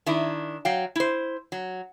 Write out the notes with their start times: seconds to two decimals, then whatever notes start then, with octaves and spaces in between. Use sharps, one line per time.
0.06 D#3 D4 E4
0.65 F#3 F5 G5
0.96 E4 C5
1.52 F#3